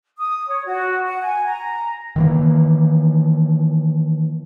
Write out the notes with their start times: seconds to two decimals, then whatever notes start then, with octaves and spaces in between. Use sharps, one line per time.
0.17 D#6
0.48 C#5
0.66 F#4
1.06 F#5
1.21 G#5
1.45 A#5
2.16 D#3 E3 A#3